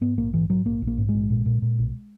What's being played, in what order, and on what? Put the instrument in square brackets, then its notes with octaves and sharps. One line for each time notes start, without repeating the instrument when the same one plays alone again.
[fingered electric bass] G#2 B3
A#1 A#3
G#2 E3
G#2 F#3
A#1 A#3
A#1
A#3
G#2
A#1 G#3
A#2
A#2
A#2
B1